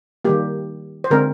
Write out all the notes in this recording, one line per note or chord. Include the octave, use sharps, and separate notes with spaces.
D#3 G3 A#3 G4
C5
D3 G#3 C4 A#4